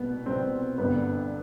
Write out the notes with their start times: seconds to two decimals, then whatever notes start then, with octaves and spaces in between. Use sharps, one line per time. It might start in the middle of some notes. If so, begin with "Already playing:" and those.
Already playing: C2 B2 B3
0.26 C2 B2 C4
0.78 G1 G2 D3 B3